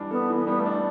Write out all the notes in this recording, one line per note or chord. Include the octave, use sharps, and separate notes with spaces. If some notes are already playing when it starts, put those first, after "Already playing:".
Already playing: E3 G3 D4
B3 A4
E3
B3
G3 B3
A3
D4